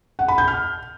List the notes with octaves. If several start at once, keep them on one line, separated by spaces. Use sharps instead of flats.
F#5
B5
G6
F6